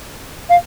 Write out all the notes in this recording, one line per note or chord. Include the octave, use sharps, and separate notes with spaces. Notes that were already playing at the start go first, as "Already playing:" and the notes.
F5